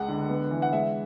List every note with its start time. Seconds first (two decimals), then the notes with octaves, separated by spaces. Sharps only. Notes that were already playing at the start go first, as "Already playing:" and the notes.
Already playing: C#2 G#3 F#5
0.08 D3
0.29 B3
0.51 E3
0.62 F#5
0.72 G#3 E5